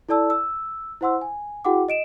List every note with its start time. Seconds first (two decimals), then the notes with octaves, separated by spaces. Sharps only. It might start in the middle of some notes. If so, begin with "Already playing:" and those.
0.09 E4 A4 D5 A5 E6
0.30 E6
1.01 E4 C5 F#5 C6 E6
1.21 G#5
1.65 E4 F#4 G#4 F#5 G5 D6
1.89 D#5 D7 E7